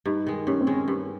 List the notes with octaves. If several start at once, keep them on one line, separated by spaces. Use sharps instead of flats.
G2 D#4
D#3 G#3
G2 C#4
C4
D#3 G#3
C#4
G2